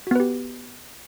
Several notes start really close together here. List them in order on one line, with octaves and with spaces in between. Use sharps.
F#4 B3 B4 G4